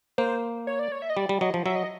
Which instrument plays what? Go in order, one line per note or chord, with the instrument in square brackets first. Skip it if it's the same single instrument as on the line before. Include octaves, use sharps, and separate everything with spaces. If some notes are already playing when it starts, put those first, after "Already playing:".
[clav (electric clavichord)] A#3 [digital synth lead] C5
[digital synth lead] C#5
D5
C#5
E5
D#5
[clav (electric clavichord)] G3 [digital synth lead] D5
[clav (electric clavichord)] G3
[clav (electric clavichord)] F#3 [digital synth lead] D#5
[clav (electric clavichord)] F3
[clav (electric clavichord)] F#3 [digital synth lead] E5
[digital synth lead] D#5